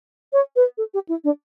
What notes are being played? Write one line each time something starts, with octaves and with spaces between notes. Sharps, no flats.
C#5
B4
A4
G4
E4
D4